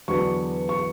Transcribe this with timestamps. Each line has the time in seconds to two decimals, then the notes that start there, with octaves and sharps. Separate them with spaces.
0.08 E2 D3 F#3 B3 D4 C#6
0.69 C#6